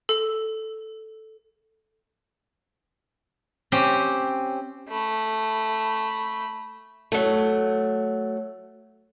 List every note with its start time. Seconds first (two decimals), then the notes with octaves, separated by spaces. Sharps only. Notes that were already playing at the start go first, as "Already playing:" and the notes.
0.09 A4
3.72 C4 C#4 G4
4.89 A3 B5
7.12 F#3 A3